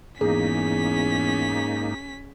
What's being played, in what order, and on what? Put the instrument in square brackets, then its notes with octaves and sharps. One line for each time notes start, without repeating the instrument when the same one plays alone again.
[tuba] E2 [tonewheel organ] G#2 A#3 D#4 [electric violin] C#4 B6 [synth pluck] G#4